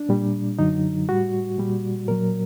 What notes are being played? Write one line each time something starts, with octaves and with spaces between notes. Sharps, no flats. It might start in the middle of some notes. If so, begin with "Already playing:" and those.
Already playing: D4
A#2 G3
F#2 D3 F#3 D#4
A2 G3 F#4
A#2 G3
A#2 F#3 A#4